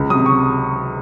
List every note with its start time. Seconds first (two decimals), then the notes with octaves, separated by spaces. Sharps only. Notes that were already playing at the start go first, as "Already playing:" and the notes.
Already playing: C#2
0.09 C3 F#3 D#6
0.26 C#6